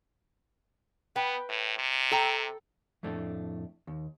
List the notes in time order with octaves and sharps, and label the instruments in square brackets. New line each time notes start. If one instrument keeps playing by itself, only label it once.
[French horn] B3 [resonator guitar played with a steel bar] B4 G5
[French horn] A2
C3
[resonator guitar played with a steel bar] A4 G5 A#5
[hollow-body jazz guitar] F2 A2 A3 D4
D#2